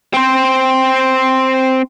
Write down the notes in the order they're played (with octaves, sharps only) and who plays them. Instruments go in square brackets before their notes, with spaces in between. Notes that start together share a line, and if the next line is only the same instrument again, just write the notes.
[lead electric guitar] C4 C5